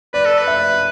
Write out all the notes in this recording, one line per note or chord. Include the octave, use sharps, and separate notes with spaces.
B4 D5
A4
B4
E5